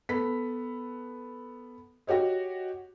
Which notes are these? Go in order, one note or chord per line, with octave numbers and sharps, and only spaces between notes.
B3 A4 B6
F#4 G4 C#5 D#5